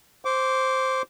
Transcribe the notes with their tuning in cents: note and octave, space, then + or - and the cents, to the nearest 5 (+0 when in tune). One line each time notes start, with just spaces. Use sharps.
C5 +0 D6 -20